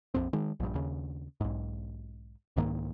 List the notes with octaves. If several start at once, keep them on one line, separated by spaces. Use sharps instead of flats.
A#1 F2 C4
D#3 G#3
A#1 G2
D#2 C#3
B1 G#2
C2 G#2 D#3 A#3